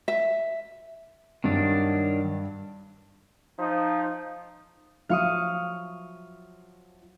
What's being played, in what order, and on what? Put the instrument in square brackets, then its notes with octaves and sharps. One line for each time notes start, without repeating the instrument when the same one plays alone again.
[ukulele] E5
[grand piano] G2 [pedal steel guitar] D#3 F#3 D4
[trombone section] F3 D#4
[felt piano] F3 F#3 E5 [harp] F5 C#6 D#6